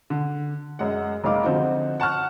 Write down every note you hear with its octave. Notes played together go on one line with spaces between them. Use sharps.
D3
F#2 G#3 F#5
F#1 G#3 D#4 F5 D6
D3 F3 C4 D#4 F#4
F#5 A5 C#6 F6 F#6